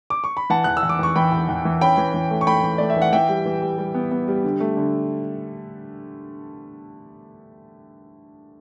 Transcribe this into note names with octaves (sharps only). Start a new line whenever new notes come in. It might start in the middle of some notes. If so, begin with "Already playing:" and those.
D6
C#6
B5
E3 F#5 A5
E2 F#6
E6
E2
D6
E2 C#6
E3 G5 B5
E2
E2
E3
C#4 G5 B5
E3
E3
A3
C#6
A3 G5 B5
E3
A3 D5
E5
E3
F#5
E3 E5 G5
G3
E3
G3
G3
B3
B3
G3
D3
A3
D3